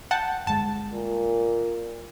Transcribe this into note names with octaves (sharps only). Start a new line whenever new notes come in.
F#5 G5 A5
G1 G#3 A5
A#2